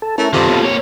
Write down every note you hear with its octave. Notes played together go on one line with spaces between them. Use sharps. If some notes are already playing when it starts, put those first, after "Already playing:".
A4
A3 C#4 E4 A#4
G2 C3 D#3 F4 A4
D#2 B2
A#3 C#5